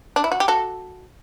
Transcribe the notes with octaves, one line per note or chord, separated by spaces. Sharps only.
D4
E4
F#4
G4
F#4 A4